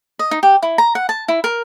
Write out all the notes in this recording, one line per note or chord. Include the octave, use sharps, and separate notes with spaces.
D#5
D#4
G4
E4
A#5
F#5
A5
E4
A#4